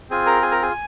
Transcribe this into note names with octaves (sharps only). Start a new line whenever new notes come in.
C4 F4 G#4 G#5
A#4 A#5
G#4 G#5
A#4 A#5
G#4 G#5